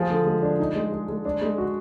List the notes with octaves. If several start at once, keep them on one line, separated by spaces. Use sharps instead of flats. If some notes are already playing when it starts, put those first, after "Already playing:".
Already playing: F3 G#4
D3
G#3
D4
D#4
G#3
G#4
G#3
D4
G#3
F#4